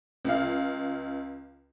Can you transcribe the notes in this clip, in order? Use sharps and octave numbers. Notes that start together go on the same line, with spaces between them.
C#2 F5